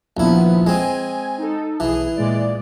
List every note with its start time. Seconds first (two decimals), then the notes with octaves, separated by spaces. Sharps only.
0.17 A#1 D#2 F3 B3 E4
0.67 G#3 C4 G#5
1.38 D#4 A4
1.80 B1 E3 G#4
2.16 A#2 G#3 D5